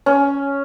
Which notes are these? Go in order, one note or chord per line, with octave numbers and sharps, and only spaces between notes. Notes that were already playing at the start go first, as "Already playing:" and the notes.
C#4